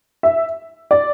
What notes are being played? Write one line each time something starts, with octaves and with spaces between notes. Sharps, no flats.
E5
D5